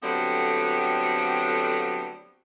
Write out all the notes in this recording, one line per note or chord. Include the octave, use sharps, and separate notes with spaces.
D3 F#3 G3 A3 B3 C4